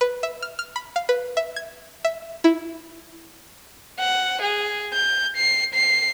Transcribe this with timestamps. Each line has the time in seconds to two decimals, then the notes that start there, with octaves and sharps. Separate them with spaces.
0.01 B4
0.23 E5
0.42 F6
0.59 F6
0.76 B5
0.96 F5
1.09 B4
1.37 E5
1.56 G#6
2.05 E5
2.44 E4
3.99 F#5
4.42 G#4
4.94 G6
5.36 C7
5.74 C7